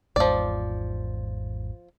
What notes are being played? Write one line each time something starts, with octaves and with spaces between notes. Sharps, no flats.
G#1 E2 G#2 F3 D5